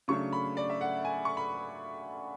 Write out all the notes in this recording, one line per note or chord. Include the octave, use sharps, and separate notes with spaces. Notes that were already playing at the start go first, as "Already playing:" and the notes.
C#3 F#3 A3 D4 C#6
B5
D5
E5
F#5
G#5
C#6
B5